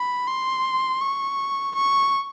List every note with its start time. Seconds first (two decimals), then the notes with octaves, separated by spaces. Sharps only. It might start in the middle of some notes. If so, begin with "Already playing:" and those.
Already playing: B5
0.27 C6
1.01 C#6
1.76 C#6